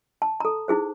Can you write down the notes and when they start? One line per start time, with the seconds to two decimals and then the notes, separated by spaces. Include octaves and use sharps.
0.22 A5
0.40 A4 A#5
0.68 D#4 E4 G#4 C5